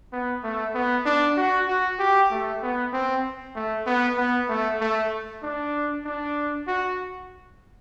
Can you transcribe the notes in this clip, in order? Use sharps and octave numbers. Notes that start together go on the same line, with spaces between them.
B3
A3
B3
D4
F#4
F#4
G4
A3
B3
C4
A3
B3
B3
A3
A3
D4
D4
F#4